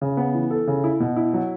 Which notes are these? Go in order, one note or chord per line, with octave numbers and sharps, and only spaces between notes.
C#3
B3
E3
A4
C#3
E4
B2
E4
F#3